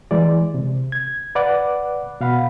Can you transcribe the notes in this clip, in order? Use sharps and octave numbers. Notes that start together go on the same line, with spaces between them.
E3 G#3 D5
C3
G#6
B4 D5 F#5 D6 F#6
B2 F5 F#5 B5